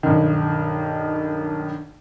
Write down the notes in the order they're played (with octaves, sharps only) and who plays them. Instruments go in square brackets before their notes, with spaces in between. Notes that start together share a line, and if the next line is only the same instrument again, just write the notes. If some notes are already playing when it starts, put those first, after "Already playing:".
[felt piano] B1 G2 D#3